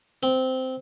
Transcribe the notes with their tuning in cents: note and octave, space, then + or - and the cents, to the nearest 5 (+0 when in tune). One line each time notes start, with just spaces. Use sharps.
C4 -10